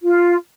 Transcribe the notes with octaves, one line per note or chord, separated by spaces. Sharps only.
F4